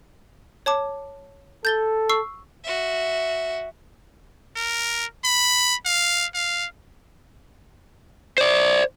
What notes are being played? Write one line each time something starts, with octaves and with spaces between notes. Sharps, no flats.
C#5 A5 D6
A4 G6 A6 G7
C#6 E6 C7
F#4 E5
A#4
B5
F5
F5
C5 D5